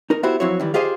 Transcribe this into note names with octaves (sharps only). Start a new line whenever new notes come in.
D#4 A#4
B3 E4 F#4 G4 C5
F2 F#3 C4 E4 F#4 C#5
D#3 E3 G3
F4 G4 G#4 C5 D#5 F5